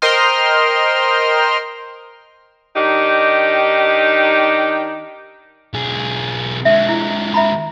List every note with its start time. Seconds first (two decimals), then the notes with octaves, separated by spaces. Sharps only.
0.02 A#4 C5 D#5 G5 C6 F6
2.76 D#3 D4 D#4 G4
5.74 B1 G#4
6.65 D3 G#3 E5
6.89 E4
7.34 E5 A#5 B5